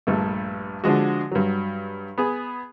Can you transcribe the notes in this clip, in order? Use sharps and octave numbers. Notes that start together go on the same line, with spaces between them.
A#1 G2 A3
D3 F3 G#3 F#4
G2 F#3
B3 G#4